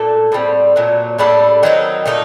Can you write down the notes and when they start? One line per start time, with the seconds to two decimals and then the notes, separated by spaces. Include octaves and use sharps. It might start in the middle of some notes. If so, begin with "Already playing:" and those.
Already playing: A#2 A3 D4 A4
0.32 A2 G3 C4
0.76 A#2 F#3 A3
1.18 A2 G3 D4 A4
1.63 D#3 F#3 C4 D#4
2.06 A#2 A3 D#4